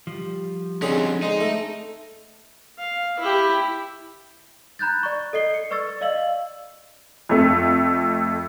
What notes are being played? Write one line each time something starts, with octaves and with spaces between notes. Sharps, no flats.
F3 G3
D3 C4 C#4 D#4 G#4
G#3 D#4 C5
A3
F5
E4 G4
A#5 B5 F#6 G6 A6
D5 C#6
A4 D#5 C7 G7
C#7
B4 D5 C#6 E6 A6
D5 D#5 F5 E6 F#7
F2 A3